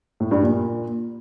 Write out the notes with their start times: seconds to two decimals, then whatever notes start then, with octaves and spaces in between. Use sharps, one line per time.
0.20 A2
0.31 G2
0.42 A#2